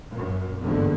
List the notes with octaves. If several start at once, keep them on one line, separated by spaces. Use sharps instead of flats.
F#2 A#2
G1 E2 G#2 B2 D3 A#3